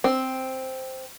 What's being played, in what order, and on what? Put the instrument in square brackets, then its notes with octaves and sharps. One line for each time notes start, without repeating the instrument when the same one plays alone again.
[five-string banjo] C4